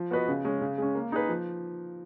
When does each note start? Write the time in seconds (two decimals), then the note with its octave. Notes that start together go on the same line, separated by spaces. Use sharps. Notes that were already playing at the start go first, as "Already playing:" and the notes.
Already playing: F3
0.11 B3 F#4 B4 D#5
0.28 C#3
0.45 G#3 C#4
0.61 C#3
0.78 G#3 C#4
0.95 A#3
1.12 D#4 G#4 B4
1.29 F3